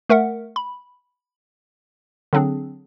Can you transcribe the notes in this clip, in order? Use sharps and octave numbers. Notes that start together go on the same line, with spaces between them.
A3 A#4 E5 F#5
B5
D3 F#3 C4 D4 G#4